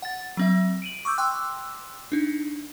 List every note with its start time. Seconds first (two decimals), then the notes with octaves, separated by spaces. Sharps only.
0.02 F#5 A6
0.37 F#3 C4 E5
0.82 D7 D#7 F#7
1.05 C#6 D6 E6 G6
1.18 G5 C6 D6 E6 F#6
2.12 D4 D#4